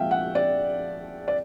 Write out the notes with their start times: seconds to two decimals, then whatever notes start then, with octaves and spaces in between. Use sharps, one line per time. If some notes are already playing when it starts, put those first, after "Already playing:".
Already playing: A#2 F3 G#3 E5 F5 G5
0.11 F#5
0.35 D5
1.28 D5